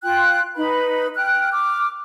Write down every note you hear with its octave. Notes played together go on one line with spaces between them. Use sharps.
F4 G5 F#6
D#4 B4 B5
G5 F6 F#6
D6 F6